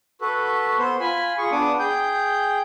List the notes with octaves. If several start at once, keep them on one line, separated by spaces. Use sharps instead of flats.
F#4 A4 B4
B3 C5
F4 G#5 B5
F4 G#4 C#6
B3 D4 D6 D#6
G#4 G5 G6